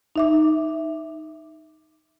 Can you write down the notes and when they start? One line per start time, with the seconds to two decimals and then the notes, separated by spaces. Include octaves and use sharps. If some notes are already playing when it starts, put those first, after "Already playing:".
0.16 D#4 E5 D6